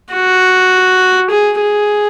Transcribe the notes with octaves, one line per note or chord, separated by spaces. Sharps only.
F#4
G#4
G#4